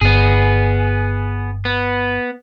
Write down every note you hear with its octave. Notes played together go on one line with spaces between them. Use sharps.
G1 B3 G#4
B3